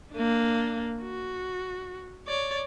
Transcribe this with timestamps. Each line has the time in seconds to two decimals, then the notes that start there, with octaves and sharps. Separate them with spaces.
0.13 A#3 D4
1.02 F#4
2.27 C#5 D5